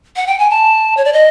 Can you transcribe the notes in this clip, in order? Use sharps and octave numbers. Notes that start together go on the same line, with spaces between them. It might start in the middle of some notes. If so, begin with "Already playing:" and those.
F#5
G5
G#5
A5
C#5
D5
D#5